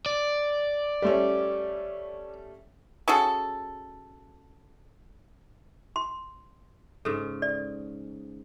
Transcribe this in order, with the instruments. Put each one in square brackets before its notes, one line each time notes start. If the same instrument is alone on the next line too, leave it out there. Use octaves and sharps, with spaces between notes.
[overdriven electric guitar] D5
[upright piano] G3 A3 C#4
[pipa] C#4 F#4 G#4 A4
[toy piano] C6
[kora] G#2 C#3 [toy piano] A4
[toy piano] D5